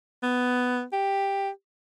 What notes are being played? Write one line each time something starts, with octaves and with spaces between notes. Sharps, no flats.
B3
G4